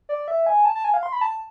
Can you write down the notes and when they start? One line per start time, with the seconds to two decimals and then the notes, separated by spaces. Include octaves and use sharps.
0.09 D5
0.28 E5
0.46 G#5
0.65 A5
0.75 A5
0.84 G#5
0.94 F5
1.03 C6
1.12 B5
1.21 A5